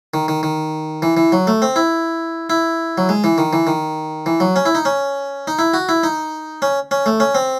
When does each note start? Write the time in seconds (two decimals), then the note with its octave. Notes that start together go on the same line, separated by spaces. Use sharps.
0.14 D#3
0.28 D#3
0.43 D#3
1.02 E3
1.17 E3
1.32 F#3
1.47 A3
1.62 C4
1.76 E4
2.50 E4
2.98 F#3
3.09 G#3
3.24 E3
3.38 D#3
3.53 E3
3.67 D#3
4.26 E3
4.40 F#3
4.56 C#4
4.66 E4
4.75 D#4
4.85 C#4
5.47 D#4
5.59 E4
5.74 F#4
5.89 E4
6.03 D#4
6.62 C#4
6.91 C#4
7.06 A3
7.20 C#4
7.35 C4